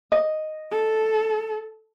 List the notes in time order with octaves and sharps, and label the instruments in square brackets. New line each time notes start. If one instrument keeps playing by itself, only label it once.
[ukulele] D#5
[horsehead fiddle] A4